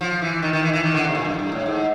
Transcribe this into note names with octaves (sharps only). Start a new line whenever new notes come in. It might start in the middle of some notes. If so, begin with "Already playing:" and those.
F3
E3
D#3
D#3
E3
E3
D#3
D3
C3
A#2
G2
F#2
G2
A2
G#2